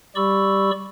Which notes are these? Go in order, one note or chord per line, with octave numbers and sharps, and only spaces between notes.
G3 G4 D5 B5 C#6 E6